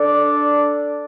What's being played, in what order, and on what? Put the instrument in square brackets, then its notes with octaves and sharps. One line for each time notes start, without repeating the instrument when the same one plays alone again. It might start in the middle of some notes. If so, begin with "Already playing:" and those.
Already playing: [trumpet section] D4 A4 D5